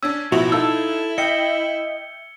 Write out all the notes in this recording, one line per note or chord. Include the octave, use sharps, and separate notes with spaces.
C#4 D4 E6 G#6
A1 B2 F3 E4 F#4 F7
D#4 F4 A4 A5 E6
D#5 E5 G5 C#7 G7